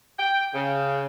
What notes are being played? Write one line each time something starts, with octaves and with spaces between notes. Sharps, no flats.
G5
C#3